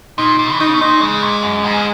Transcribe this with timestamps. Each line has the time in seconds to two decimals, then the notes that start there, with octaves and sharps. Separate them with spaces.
0.18 A#2 D#4
0.39 A#2
0.52 E3
0.60 D#3 D#4
0.67 C#3
0.74 B2
0.81 A#2 D#4
1.01 C#3 G#3
1.23 A#2
1.43 F#2
1.64 G#2